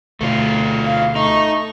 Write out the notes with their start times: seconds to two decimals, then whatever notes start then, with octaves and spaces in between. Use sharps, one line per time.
0.21 D2 B2 A3 F4
0.84 F5
1.16 A3 D#4 C#6